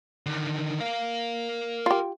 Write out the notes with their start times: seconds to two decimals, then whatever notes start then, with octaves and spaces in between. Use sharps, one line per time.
0.26 D3 D#3
0.80 A#4 F5
1.86 F4 G4